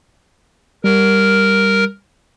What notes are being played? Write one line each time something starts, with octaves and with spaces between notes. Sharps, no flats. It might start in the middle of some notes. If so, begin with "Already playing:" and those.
G3 A#4